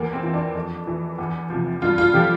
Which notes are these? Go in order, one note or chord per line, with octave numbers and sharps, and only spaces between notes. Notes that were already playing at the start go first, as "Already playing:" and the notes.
Already playing: E2 A#3
C4
E3
D4
F2
E3
E2
C3 F3
G2 F4
F4
D3 F3 G4